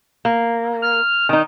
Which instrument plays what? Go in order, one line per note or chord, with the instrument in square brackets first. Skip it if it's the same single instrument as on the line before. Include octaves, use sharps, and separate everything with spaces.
[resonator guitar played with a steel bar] A#3
[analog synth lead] F6
[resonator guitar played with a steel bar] D#3 D#4